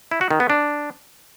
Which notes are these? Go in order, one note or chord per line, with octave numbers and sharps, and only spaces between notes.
E4
F#4
D#3
B3
D4